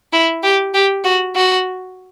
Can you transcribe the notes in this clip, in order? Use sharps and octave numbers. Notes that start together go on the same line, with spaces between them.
E4
G4
G4
F#4
F#4